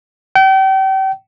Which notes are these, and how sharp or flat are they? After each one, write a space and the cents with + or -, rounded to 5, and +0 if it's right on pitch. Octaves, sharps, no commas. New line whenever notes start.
G5 -35